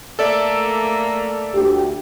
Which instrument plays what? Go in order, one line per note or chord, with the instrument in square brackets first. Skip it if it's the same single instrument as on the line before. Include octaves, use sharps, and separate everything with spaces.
[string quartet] A3 A#3 [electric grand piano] A4 D5 E5
[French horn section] D2 G4